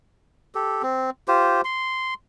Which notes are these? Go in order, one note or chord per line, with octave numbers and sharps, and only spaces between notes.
G4 A4
C4
F4 G4 C5
C6